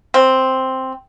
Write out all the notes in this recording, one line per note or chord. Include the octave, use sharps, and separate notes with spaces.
C4